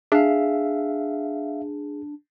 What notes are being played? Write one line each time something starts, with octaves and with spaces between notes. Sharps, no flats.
D4 G#4 E5 F5